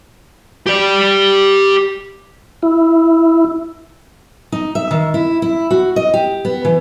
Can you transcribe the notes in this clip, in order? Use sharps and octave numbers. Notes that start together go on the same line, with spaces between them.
G4 D5
E4
D#4
E5
D#3
E4
E4
F#4
D#5
G4
B3
E3